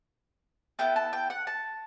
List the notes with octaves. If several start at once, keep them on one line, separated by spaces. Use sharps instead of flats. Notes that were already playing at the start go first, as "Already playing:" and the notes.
B3 E4 A4 G5
A5
G5
F#5
A5